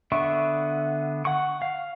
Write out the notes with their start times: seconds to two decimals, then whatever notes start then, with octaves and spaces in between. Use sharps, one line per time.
0.12 D3 B3 E5 C#6
1.25 F#5 C#6
1.62 F5